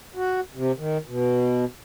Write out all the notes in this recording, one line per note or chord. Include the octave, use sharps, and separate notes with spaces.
F#4
C3
D#3
B2